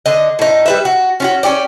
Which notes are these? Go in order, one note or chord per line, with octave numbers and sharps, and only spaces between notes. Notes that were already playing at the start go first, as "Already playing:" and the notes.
D3 D#5
A2 D#4
G3 B4 E5
F#4
C#4 F4 F#4
C#4 E4 G4 D5